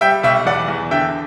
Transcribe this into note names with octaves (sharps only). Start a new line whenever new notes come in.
G3 E5 G5
B1 E5 G5
E2 D5 F#5
E2
D3 E5 G5